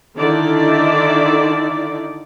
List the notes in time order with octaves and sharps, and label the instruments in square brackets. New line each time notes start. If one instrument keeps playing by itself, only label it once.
[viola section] D3 D#3 D#4 E4 D5